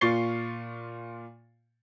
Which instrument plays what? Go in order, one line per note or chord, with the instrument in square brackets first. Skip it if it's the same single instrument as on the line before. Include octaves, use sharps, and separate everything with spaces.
[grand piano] A#2 F4 C#6 A6 C7 G7